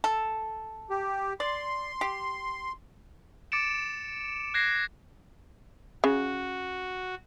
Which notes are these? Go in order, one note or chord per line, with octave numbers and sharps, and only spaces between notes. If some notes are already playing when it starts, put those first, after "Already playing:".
A4
G4
D5 C6
G4
D6 A6 C#7 D7 E7
F#6 G#6 A#6 C7
C#3 F#4